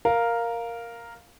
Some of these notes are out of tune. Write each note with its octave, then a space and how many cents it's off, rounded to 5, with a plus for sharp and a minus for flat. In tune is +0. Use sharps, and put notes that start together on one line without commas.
A#4 +0 F5 +0